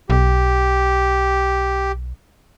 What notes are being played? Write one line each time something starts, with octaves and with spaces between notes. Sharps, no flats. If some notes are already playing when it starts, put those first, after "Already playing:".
B1 G4